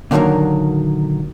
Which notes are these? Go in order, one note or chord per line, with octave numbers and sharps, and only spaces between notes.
A#2 D3 D#3 F3 F#3 A#3